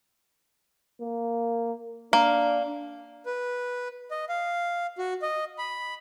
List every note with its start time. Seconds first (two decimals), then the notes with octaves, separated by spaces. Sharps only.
1.01 A#3
2.13 A#3 D4
3.26 B4
4.11 D#5
4.29 F5
4.98 F#4
5.22 D#5
5.58 B5